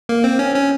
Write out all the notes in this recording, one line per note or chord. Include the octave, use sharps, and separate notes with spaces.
A#3
C4
C#4
C#4